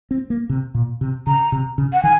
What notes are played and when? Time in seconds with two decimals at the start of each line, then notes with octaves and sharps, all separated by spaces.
0.11 C4
0.30 A#3
0.49 C3
0.75 A#2
1.01 C3
1.27 C#3 A#5
1.52 C3
1.78 C#3
1.93 F#5
2.03 D#3 G#5